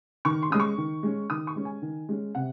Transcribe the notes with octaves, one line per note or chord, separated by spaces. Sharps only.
D#3 C#6
C6
G#3 C#4 D#6
C#6
D#3
G#3 C#4
D#3 D#6
C#6
G#3 C#4
G#5
D#3
G#3 C#4
C3 F#5